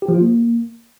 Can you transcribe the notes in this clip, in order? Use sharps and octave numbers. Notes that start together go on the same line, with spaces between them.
G4
F3
F4
A#3